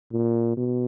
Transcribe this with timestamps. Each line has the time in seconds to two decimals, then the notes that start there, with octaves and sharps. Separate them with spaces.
0.12 A#2
0.57 B2